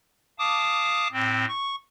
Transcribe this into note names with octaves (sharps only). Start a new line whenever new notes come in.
F5 A5 D6 D#6
A2 C4
C#6